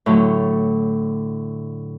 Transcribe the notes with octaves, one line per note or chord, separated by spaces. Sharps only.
A2 D3 F#3 A3